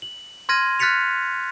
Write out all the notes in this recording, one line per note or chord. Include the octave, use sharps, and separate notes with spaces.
F#7
C6 F6 G#6 A#6 D#7
F6 F#6 A6 B6 C#7 F7